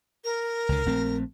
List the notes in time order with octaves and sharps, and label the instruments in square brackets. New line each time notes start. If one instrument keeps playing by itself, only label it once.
[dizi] A#4
[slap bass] C#2 D3
A#1 A3 C4